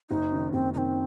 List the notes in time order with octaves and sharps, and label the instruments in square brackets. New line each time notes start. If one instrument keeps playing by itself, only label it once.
[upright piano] F#1 [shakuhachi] D#4
[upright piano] F#2 D#3
[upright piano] F#1 [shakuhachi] C4
[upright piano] F#2 D#3 [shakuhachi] C4 D#4